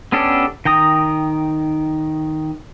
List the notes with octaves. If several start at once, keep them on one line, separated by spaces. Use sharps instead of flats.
B3 C#4 D4 G4 A4
D#3 G5 A#5 D#6